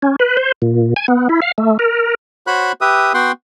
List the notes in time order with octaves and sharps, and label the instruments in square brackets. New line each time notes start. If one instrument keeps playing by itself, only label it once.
[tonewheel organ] C#4
B4
C5
A#2
G#5
B3
E4
F5
A3
A#4
[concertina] F#4 C5 C#5 B5 F#6
G4 B4 E5 D#6
B3 F#4 F#5 G5 C6